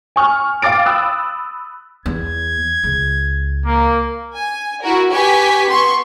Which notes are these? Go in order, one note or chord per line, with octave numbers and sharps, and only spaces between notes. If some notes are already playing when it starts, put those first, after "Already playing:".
G#5 C#6 F6
F5 G5 D6 A6 D7
B5 D#6 E6 F#6
E2 G#6
C#2
A#3
G#5
E4 F#4 A#4
G4 B4 G#5 C#6 B6
B3 C6 C#6